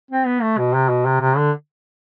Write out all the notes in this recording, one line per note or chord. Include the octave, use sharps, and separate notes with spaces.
C4
B3
A3
B2
C3
B2
C3
C3
D3